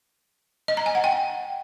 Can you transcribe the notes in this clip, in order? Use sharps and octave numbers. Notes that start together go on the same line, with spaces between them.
D#5
A#5
G#5
F#5
G5